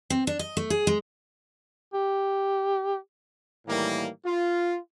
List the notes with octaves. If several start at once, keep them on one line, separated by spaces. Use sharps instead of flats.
C4
D4
D#5
A3
G#4
G#3
G4
A2 D#3 E3 G3 A#3
F4